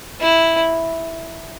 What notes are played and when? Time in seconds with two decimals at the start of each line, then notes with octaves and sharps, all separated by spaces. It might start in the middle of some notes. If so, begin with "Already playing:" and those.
0.21 E4